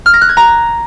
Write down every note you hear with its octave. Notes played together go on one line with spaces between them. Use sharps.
F6
A#6
F#6
G#6
A#5